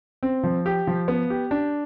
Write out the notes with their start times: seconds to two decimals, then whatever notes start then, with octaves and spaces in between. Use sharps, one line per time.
0.23 C4
0.43 F3
0.66 G4
0.87 F3
1.08 B3
1.30 G4
1.51 D4